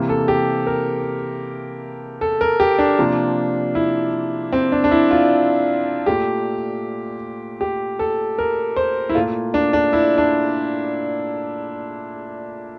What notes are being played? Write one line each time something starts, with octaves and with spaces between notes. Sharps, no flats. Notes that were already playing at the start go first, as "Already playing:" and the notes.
Already playing: C3 E3 A#3
A4
G4
A#4
A4
A#4
G4
D4
C3 F3 A#3
E4
C4
D4
D4
E4
F4
A#2 A3 G4
G4
A4
A#4
C5
E4
A#2 A3 F4
D4
D4
E4
D4